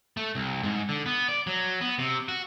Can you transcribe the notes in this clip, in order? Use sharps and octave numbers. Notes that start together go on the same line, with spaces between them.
A3
C2
G#2
D3
B3
D5
F#3
B3
C3
F#4